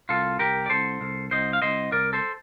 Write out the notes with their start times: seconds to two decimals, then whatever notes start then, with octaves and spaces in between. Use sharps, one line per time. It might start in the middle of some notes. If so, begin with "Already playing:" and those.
0.09 C2 F4 A4
0.39 C2 G4 A#4
0.66 D5
0.70 C2 A4 C5
1.01 C2
1.31 C2 C5 D#5
1.53 F5
1.62 C2 C5 D#5
1.92 C2 A#4 D5
2.13 A4 C5